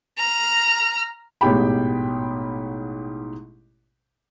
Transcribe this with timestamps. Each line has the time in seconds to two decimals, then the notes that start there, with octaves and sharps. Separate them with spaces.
0.18 A#5 F6
1.41 A1 G#2 B2 G4 G5 B5